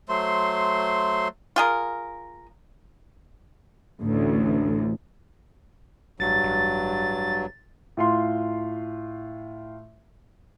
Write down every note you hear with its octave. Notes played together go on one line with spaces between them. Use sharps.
F#3 A3 C5 C6
F4 G#4 A#4
A1 D2
A1 G2 F#3 A6
A1
A2 F4 C6